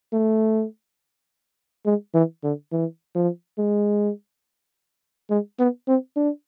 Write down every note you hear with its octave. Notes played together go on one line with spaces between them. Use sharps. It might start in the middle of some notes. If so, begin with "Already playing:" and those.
A3
G#3
E3
D3
E3
F3
G#3
G#3
B3
C4
D4